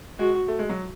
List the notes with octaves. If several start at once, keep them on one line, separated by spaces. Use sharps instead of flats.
G#3 F#4
A3
G#3
F#3